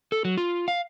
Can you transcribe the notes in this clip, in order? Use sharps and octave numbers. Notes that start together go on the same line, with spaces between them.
A4
F#3
F4
F5